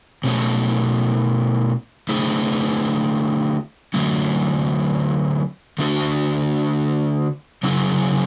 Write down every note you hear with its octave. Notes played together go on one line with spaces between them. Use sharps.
B2 A3 C#4
D3 A3 E4 G#4
D3 F#3 A3 C#4
D3 A3 D4 F#4
C#3 F#3 C#4 E4 G#4